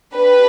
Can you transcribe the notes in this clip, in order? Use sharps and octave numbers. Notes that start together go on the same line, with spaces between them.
D4 G4 B4